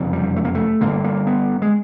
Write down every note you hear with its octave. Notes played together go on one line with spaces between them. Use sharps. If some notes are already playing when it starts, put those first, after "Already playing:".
Already playing: F#1 F2 C3
G3
A3
A#3
A3
G1 G2 D3 A#3
A#3
B3
G#3